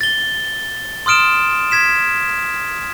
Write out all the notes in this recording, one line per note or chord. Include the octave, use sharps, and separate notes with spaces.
A6 G7
C6 D#6 F6 D7 E7
G#6 B6 E7